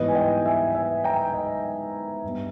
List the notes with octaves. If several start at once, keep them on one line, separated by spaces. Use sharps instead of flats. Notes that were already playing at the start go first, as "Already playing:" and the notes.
Already playing: G#2 E3 G3 B3 B4 D#5
G#5
D#5 G5
E5 G#5
E5 G#5
G5 A#5
D#5 G5
G2 G3 B3